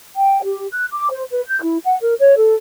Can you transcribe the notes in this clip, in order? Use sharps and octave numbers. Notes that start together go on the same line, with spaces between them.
G5
G4
F#6
D6
C5
B4
G6
E4
F#5
A#4
C#5
A4